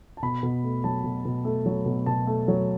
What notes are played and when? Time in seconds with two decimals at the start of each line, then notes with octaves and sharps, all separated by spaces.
0.17 A5
0.22 B2 B5
0.43 B2
0.64 A3
0.84 F#3 A5
1.04 B2
1.25 B2
1.45 A3
1.66 F#3
1.86 B2
2.06 B2 A5
2.27 A3
2.48 F#3